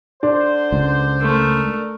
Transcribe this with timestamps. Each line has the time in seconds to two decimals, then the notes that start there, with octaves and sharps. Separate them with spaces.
0.23 D3 D4 C5
0.72 C#2
1.21 A3 A#4